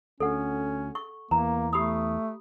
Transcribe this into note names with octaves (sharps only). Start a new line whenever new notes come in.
D2 C#4 A4 F#5
C#6
E2 E3 A#3 A#5
A3 G4 B5 D#6